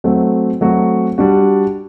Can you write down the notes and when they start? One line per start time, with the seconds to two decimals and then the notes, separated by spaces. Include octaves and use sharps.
0.04 F#3 A3 C4 F#4
0.61 F#3 A3 C4 F#4
1.18 G3 D4 F#4